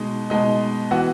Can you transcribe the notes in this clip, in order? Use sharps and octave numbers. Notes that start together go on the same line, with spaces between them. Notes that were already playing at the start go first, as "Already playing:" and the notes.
Already playing: B2 G#3 D#4
B2 G#3 D#4
E3 B3 F#4